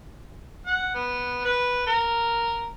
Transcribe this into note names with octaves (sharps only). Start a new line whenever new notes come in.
F#5
B3
B4
A#4